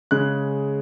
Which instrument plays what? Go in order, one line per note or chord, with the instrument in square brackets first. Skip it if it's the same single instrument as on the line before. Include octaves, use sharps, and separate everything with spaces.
[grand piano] C#3 G#3 F#6